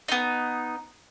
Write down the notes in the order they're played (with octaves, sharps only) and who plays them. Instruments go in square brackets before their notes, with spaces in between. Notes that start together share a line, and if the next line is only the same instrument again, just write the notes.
[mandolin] B3 D#4